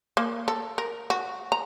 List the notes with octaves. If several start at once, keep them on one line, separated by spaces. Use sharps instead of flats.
A#3
A4
A#4
F#4
A#5